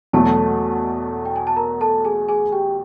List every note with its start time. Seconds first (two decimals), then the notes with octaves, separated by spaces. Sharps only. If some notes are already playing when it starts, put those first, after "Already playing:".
0.13 E2 B2 F#3 A3 A4 A5
1.25 G5
1.36 G#5
1.47 A5
1.56 A#4 A#5
1.81 A4 A5
2.05 G#4 G#5
2.29 G#4 G#5
2.52 G4 G5